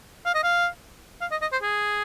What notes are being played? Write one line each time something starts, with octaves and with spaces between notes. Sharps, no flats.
F5
D#5
F5
F5
D#5
D#5
C5
G#4